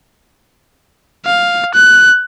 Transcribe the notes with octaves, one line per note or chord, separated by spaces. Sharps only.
F5
F#6